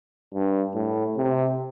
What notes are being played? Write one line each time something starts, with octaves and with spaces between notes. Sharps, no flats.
G2
A2
C3